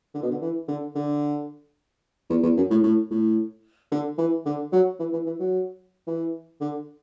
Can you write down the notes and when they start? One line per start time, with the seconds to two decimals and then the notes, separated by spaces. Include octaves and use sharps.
0.14 D3
0.22 B2
0.31 D3
0.41 E3
0.68 D3
0.95 D3
2.30 E2
2.43 E2
2.57 F#2
2.70 A2
2.83 A2
3.11 A2
3.92 D3
4.18 E3
4.46 D3
4.72 F#3
4.99 E3
5.13 E3
5.26 E3
5.40 F#3
6.07 E3
6.61 D3